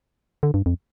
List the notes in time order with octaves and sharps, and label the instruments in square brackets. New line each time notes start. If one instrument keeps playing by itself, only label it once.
[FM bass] D3
G2
F2